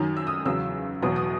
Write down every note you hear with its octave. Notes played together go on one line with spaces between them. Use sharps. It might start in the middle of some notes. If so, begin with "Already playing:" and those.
Already playing: F#2 D#3 F#3
E6
D#6
E2 C#3 F#3 E6
E2 B2 F#3 D#6
D#6